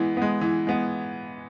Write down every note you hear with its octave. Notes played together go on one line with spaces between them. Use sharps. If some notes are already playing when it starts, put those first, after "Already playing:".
Already playing: E3 G#3 B3
G#3 B3
E3
G#3 B3